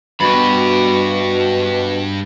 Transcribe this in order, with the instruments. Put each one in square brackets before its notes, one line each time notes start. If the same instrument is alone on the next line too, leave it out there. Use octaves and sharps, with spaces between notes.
[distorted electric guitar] G2 G4 [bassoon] B2 [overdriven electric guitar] F#4 B5